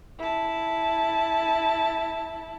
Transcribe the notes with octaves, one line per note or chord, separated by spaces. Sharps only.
E4 A5